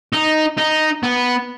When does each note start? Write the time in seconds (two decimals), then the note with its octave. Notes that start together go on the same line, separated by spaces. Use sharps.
0.13 D#4
0.58 D#4
1.03 B3